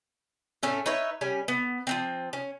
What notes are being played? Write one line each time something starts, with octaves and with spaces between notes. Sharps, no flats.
A2 A3 C#4 E5
D#4 B4 C#5 E5
G3 C#4 G#5
B3
F3 F#3 C4
C#4